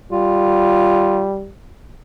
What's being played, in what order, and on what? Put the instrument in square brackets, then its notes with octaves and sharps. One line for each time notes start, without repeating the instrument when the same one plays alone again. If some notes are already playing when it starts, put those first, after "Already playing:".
[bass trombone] G3 [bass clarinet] F4